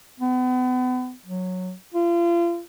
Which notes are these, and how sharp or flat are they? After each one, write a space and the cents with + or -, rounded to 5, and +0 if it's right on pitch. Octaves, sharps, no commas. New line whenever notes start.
B3 +35
F#3 -10
F4 -35